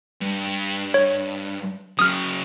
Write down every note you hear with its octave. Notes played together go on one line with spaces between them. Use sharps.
G2
C#5
C#3 F#3 D#6 F6